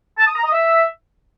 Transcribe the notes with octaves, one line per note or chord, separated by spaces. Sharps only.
A5
D#6
A#5
D#5
E5